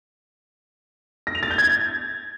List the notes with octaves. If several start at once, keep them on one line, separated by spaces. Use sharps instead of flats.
A#6
F7
A6
G6
G#6